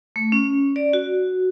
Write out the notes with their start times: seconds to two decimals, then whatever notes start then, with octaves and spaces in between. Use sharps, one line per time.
0.16 A3
0.32 C#4
0.76 D5
0.93 F#4